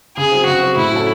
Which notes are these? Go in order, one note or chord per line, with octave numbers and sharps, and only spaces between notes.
C#3 G#4
F#3 C4
C#3 F#4
F#3 C4
A2 E4
F#3 C#4 F#4 A4